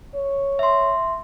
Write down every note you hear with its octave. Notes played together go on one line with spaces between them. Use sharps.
C#5
E5 C6